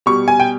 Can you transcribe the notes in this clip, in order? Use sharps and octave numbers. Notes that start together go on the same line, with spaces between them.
B2 G3 C#6
G#5
G5